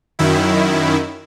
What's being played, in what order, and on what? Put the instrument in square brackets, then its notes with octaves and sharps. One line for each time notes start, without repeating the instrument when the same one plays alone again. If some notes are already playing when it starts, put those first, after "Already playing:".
[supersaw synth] F#2 D#3 E4